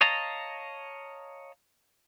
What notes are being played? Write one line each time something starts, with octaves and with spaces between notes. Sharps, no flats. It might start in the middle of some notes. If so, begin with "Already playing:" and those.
C#5 D#5 F5 A5 A#5